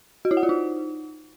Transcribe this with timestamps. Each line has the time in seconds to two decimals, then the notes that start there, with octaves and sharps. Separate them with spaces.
0.25 F#4
0.31 E4
0.37 F#5
0.43 F4
0.49 D#4